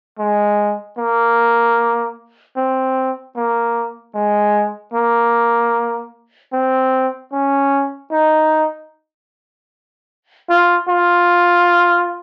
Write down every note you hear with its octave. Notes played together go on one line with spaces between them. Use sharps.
G#3
A#3
C4
A#3
G#3
A#3
C4
C#4
D#4
F4
F4